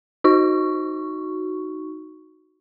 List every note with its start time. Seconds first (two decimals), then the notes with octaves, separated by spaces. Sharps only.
0.24 D#4 F#4 C#6